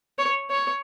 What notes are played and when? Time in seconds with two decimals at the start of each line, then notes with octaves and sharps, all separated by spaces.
0.19 C#5
0.50 C#5